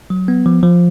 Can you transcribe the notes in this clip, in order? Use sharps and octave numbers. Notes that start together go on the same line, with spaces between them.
F#3
B3
F3
F3